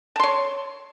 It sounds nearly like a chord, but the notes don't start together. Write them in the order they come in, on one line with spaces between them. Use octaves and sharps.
A5 C6 C#5